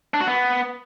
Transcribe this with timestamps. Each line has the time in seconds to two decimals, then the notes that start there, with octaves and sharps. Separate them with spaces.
0.14 D4
0.21 F#4
0.28 B3